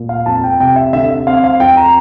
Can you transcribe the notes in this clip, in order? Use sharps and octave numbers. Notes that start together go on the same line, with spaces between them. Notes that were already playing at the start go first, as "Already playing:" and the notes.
Already playing: A#2
F5
F2 A5
G5
C3 G5
E5
D3 E5
E5
C4 F5
F5
F2 G5
A#5